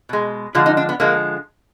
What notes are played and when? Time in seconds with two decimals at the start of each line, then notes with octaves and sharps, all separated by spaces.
0.09 B2 G#3
0.55 D3 F3 G#3 F4
0.66 D#4
0.77 D4
0.89 B3
1.00 D3 F3 G#3 A#3